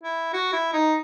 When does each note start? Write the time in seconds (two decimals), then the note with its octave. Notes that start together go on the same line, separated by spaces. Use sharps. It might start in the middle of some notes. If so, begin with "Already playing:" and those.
0.03 E4
0.33 F#4
0.53 E4
0.73 D#4